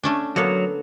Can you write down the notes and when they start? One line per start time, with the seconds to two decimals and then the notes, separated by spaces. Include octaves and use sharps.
0.04 A3 C#4 D4
0.36 D3 F#3 A#3 B3 C#5